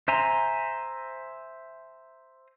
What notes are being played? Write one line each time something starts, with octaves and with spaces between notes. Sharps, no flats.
C5 E5 G#5 A#5 C6